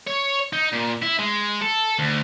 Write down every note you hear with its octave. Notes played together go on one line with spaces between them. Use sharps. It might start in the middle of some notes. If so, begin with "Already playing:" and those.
C#5
D#4
A#2
E4
G#3
A4
D2